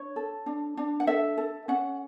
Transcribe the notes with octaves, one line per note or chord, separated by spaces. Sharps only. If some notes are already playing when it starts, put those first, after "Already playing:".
Already playing: D4 C#5
A4
D4
D4
F#5
A4 E5
A4
C#4 F#5